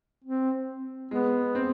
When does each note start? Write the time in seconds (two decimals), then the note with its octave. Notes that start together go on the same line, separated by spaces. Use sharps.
0.25 C4
1.11 G#3 B3
1.55 C4